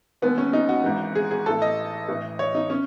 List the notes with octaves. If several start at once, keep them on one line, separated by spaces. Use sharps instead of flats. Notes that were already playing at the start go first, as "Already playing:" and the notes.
E1 D#2 D#3 B3
C#4
D#4
F#4
G#1 G#2 E3
G#4
G#4
A1 A2 E3 A4
D#5
A1 A2 E3
C#5
D#4
C#4